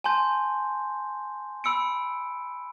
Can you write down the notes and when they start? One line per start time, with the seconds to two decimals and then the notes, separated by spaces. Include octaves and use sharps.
0.04 G#5 A5 C6 G6
1.64 B5 E6 C#7 D7